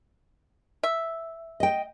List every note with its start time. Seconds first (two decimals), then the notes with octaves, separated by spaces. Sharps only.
0.83 E5
1.60 D#5 G5